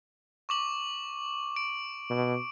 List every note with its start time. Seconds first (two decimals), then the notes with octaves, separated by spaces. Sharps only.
0.49 C#6 D6 F#7
1.56 D7
2.10 B2